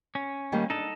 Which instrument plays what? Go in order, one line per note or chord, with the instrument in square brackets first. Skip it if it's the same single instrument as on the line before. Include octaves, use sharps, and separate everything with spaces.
[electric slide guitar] C#4
[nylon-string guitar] D#3 G3 A#3
[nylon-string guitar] D4 [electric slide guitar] D#4 A4